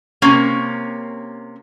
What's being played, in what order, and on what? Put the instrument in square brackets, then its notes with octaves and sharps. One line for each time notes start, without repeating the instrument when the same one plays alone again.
[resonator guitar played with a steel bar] C3 A#3 C#4 A#4